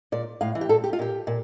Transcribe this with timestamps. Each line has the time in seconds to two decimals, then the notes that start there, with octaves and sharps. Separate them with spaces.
0.12 A#2 D5
0.41 A2 F5
0.55 E3
0.61 G4
0.69 A#2 A4
0.84 G4
0.93 F4
0.99 A#2 G4
1.27 A#2